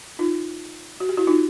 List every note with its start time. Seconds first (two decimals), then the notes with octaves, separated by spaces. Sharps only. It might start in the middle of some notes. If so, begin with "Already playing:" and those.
0.19 D#4 F4
1.00 F#4
1.09 G4
1.17 E4 F#4
1.27 D#4 F4